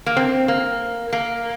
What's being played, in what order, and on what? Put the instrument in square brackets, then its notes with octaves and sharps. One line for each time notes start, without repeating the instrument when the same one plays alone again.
[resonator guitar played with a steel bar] A#3
C4
A#3
A#3